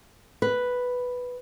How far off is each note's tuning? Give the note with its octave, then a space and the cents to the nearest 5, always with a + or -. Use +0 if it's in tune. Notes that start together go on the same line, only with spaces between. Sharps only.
B4 +0